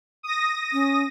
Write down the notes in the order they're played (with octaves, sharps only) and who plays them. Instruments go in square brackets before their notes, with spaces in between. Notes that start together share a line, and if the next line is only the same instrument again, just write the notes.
[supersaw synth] D#6 A#6
[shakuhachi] C#4